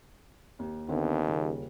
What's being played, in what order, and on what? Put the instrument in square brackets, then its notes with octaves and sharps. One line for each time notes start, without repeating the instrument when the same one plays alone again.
[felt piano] D#2
[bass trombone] D#2 [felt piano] D3 B3 C4
[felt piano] D#1 C#3